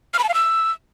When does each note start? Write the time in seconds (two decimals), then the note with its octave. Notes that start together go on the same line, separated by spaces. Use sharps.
0.14 F6
0.19 B5
0.24 A5
0.29 F5
0.34 E6